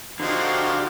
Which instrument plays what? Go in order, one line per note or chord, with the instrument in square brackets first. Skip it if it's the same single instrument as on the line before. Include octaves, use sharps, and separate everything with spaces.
[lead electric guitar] D3 [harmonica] F3 C4 D#4 [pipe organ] F#4 G4 F5